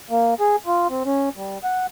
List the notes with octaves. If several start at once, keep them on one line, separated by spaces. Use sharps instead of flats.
A#3
G#4
F4
C4
C#4
G3
F#5